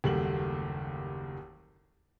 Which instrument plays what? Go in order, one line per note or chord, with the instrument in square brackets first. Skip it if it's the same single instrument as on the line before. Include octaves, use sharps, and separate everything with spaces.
[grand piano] F#1 D#2 G3 A3 F#4 F#7